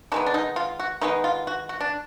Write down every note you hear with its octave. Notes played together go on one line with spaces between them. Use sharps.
D#3 G#3 B3 D4
D4
D#4
F4
F#4
D#3 G#3 B3 D#4
F4
F#4
F#4
D4